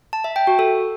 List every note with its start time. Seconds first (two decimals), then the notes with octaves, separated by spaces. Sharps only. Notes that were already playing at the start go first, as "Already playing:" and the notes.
0.13 A5
0.24 E5
0.36 G5
0.47 F#4
0.59 A4